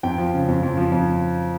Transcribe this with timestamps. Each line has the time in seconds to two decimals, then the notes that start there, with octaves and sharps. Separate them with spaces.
0.03 F2 G5
0.18 F3
0.33 C#3
0.48 F2
0.63 F2
0.77 F3
0.92 F2